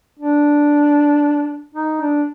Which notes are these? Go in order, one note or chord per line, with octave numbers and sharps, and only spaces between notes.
D4
D#4
D4